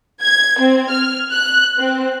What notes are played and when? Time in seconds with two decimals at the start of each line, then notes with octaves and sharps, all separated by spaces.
0.22 G#6
0.60 C4
0.91 F6
1.32 F#6
1.78 C4